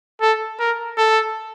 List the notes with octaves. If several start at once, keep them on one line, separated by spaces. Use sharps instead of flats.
A4
A#4
A4